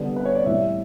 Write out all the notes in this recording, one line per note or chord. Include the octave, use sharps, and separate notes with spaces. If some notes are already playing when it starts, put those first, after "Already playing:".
Already playing: D3 G3 B3
B4
C#5
D5
A2 E3 G3 E5